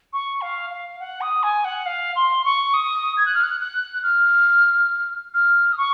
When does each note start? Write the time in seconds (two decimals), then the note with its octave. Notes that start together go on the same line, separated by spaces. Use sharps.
0.13 C#6
0.41 F5
0.70 F5
1.00 F#5
1.21 D#6
1.43 G#5
1.64 F#5
1.86 F5
2.16 C6
2.45 C#6
2.74 D#6
3.17 G#6
3.26 F#6
3.34 F6
3.43 F#6
3.60 F#6
4.03 F6
5.34 F6
5.73 D#6
5.78 C#6